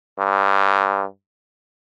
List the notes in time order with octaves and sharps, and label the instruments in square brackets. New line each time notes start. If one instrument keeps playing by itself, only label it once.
[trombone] G2